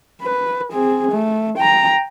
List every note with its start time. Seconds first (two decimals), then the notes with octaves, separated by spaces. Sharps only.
0.22 B4
0.72 C4 G#4
1.12 A3
1.58 G5 A#5